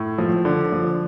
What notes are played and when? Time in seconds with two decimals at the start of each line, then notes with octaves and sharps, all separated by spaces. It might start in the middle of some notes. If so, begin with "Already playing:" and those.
Already playing: A2
0.18 F3
0.45 D3
0.72 F3